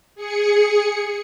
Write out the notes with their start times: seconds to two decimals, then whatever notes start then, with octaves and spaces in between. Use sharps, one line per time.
0.15 G#4 C#7